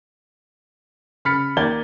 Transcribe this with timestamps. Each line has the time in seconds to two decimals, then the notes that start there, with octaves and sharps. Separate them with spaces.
1.25 C#3 B5 F6 A6 B6 C#7
1.57 D#2 A#3 D5 G6 G#6 G7